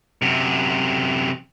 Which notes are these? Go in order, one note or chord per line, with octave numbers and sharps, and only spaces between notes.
F#2 C3